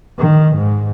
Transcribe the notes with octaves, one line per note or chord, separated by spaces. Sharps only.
D#3
G#2